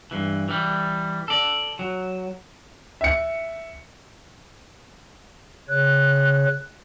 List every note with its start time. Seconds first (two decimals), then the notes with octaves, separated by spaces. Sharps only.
0.11 G2 E3
0.49 E3 G3
1.28 A4 D5
1.79 F#3
3.01 E5 C#7
5.69 C#3 C#5 F#6